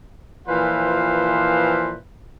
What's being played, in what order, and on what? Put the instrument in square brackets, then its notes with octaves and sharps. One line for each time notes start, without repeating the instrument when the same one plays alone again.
[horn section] A#2 E3 F3 B4 C5 F5